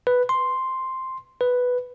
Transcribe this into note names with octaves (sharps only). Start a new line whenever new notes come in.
B4
C6
B4